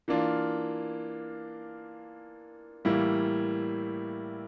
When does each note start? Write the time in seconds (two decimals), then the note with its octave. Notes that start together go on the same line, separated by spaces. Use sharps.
0.08 E3 A#3 D4 F4
2.85 A2 E3 G3 A#3 E4